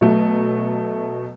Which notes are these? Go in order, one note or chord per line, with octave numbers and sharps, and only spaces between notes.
B2 F#3 A3